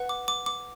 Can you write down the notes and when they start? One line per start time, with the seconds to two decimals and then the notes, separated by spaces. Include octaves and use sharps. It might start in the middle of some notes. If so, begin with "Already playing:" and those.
Already playing: B4 F#5
0.09 D6
0.28 D6
0.46 D6